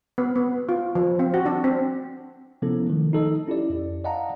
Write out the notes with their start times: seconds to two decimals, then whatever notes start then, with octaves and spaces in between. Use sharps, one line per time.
0.18 B3
0.36 B3
0.69 F4
0.95 F3
1.19 C4
1.34 F#4
1.46 D4
1.64 C4
2.62 C3 F3 B3 C#4 E4 A4
2.86 D#3 F3 F#3 A3
3.13 D#4 A4 D#5
3.47 C#4 E4 G4 D5
3.70 F2
4.04 D5 D#5 F5 F#5 A5 A#5